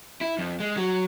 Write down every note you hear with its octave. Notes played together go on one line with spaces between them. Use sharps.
E4
F2
G#3
F#3